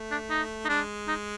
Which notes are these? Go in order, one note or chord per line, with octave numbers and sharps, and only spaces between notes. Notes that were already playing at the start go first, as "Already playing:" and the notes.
Already playing: A3
D4
D#4
D#4
G#3 D4
D#4